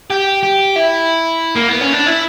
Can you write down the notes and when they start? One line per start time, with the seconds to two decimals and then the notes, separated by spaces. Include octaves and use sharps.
0.11 G4
0.43 G4
0.76 E4
1.55 A#3
1.68 B3
1.81 C#4
1.93 D4
2.07 E4